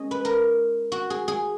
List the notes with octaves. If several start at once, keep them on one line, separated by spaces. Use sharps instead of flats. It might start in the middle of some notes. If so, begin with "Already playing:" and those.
Already playing: G#3 C#4 C#5 D#5
B4
A#4
F#4
G#4
G#4